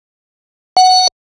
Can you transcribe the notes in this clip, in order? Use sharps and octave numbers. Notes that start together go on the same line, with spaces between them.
F#5